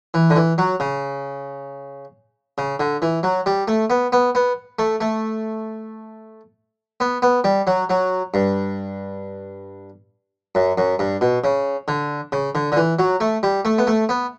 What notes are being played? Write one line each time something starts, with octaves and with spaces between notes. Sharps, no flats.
E3
D3
E3
F#3
C#3
C#3
D3
E3
F#3
G3
A3
B3
B3
B3
A3
A3
B3
B3
G3
F#3
F#3
G2
F#2
F#2
G2
B2
C#3
D3
C#3
D3
D3
E3
F#3
A3
G3
A3
B3
A3
B3